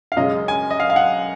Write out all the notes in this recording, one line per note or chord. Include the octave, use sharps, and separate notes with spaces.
F5
F#2 C#3 G#3 C#4 D#5
G#5
D#5
F5
F5
F#5